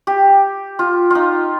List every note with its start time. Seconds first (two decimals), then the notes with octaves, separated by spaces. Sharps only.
0.07 G4
0.79 F4
1.10 D#4 F4